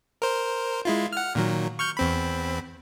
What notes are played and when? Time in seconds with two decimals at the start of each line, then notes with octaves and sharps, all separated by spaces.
0.22 A#4 C5
0.85 G#3 E4 F4
1.13 F#5 F6
1.35 A#2 D#3 F#3
1.79 C#6 F6 G6
1.97 E2 C4 B5